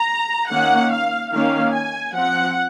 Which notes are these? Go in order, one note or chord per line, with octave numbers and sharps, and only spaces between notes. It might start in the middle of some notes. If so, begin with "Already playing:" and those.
Already playing: A#5
D#3 A#3 C#4 F#5
F5
D#3 A#3 C#4 F5
G#5
F3 C4 F#5